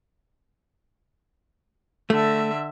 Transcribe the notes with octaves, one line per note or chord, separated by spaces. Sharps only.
D3 A3 E5